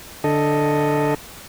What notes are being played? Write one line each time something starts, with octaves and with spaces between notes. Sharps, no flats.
D3 A4 D#5